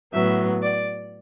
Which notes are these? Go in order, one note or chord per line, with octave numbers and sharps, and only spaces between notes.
A2 F#3 B3 E5
D5